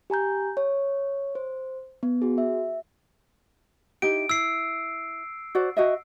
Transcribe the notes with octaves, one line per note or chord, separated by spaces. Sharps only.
G4 G#5 A#5 G6
C#5
C5
B3
F#4 G#4
E5
D#4 E4 G4 D7
E4 E6 C7
F#4 C5 D5
F#4 D#5 E5